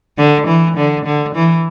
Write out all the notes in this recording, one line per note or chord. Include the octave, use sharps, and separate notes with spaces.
D3
E3
D3
D3
E3